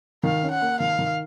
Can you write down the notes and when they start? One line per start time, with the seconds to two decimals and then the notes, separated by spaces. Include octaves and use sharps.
0.23 D#3 F5
0.43 C#4
0.51 F#5
0.62 A#3
0.80 D#3 F5
0.99 D#3